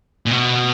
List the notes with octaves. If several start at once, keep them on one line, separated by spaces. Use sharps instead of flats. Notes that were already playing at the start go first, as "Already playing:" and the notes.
A#2
B2